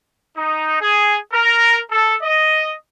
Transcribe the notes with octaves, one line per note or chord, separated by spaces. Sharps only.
D#4
G#4
A#4
A4
D#5